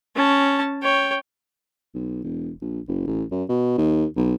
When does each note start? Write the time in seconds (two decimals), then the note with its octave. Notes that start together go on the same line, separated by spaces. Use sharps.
0.16 C#4 A5
0.82 C#5 G5
1.94 B1
2.24 E1
2.61 A#1
2.88 F#1
3.07 A1
3.31 F#2
3.49 B2
3.78 D#2
4.16 B1